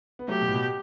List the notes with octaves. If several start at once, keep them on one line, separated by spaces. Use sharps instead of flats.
B3
F#3 A3 G4
B2
A2
B2